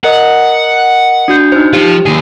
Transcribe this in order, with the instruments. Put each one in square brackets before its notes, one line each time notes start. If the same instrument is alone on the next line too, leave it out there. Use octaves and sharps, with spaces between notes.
[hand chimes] A#4 D#5 [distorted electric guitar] F#5
[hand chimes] D4 F#4 G6
D#4 C5
[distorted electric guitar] F3 F4 [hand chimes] G4
[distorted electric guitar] D#2 G#4